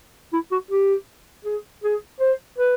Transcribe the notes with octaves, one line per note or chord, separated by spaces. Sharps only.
E4
F#4
G4
G#4
G#4
C5
B4